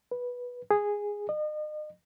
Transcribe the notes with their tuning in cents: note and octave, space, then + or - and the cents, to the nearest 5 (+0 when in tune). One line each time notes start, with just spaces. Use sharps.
B4 -10
G#4 -10
D#5 -40